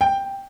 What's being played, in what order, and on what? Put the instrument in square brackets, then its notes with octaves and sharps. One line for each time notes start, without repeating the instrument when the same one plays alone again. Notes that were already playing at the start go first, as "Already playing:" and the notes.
[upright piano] G5